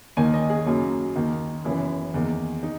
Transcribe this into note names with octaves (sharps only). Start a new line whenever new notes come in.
D#2 D#3 A#3 G#5
D#5
G#4
F#2 C#3 F#3 A#3
D#2 D#3 A#3
F#1 F#2 E3 B3 E4
E2 D#3 A#3
D#4